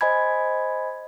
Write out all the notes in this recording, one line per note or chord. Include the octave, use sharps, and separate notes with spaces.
C5 D#5 G#5 B5 G#6